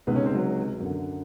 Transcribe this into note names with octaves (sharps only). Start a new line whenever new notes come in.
C#2 C3 D#3 B3
C#4
C4
F#3
F#2 D3